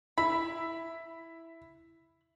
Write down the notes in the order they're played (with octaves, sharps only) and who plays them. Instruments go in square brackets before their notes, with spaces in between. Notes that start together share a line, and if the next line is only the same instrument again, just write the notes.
[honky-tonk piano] E4 [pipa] B5